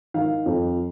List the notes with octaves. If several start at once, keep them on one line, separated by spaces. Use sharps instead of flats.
D#3 F5
F2